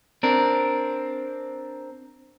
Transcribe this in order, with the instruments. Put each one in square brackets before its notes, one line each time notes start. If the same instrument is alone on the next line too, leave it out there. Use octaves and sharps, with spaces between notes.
[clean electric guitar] C4 D4 A#4